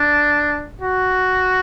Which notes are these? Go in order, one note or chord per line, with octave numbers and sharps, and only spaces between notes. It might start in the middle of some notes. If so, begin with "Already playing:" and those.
Already playing: D4
F#4